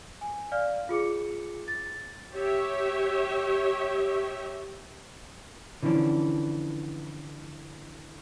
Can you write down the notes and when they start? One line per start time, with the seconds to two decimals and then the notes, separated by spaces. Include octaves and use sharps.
0.21 G#5
0.52 D5 F5 F6
0.89 F4 G#4 D6 C#7
1.68 A6
2.33 G4 C#5 E5
5.83 D3 E3 F3 C#4 D4